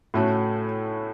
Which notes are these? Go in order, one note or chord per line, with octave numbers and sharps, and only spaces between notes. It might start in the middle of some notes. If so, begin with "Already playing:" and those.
A2 A3 C#4 F#4